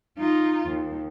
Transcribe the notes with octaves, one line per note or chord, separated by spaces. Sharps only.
D#4 F4
D#2